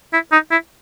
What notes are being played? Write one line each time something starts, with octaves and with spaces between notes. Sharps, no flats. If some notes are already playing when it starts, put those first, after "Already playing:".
E4
D#4
E4